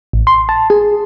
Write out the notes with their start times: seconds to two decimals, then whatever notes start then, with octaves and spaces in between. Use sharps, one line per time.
0.13 A1
0.27 C6
0.49 A5
0.70 G#4